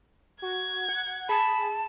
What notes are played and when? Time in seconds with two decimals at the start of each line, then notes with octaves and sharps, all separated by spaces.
0.42 F#4 G#6
0.89 F#5
1.29 G#4 A5 B5